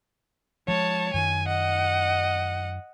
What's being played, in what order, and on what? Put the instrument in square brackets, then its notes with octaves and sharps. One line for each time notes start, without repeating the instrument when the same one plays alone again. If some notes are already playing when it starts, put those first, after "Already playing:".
[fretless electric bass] F3 G#3 [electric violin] C#5 A5
[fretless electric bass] F#2 D#3 [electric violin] G#5
[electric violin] D#5 F#5